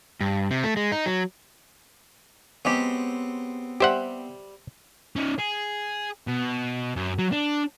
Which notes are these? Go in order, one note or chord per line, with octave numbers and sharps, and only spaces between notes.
G2
C3
A3
G#3
D#4
F#3
F#3 G#3 B3 C4 G4
G3 G4 C5 E5 F#5
C#4 D#4
G#4
B2
F#2
F#3
D4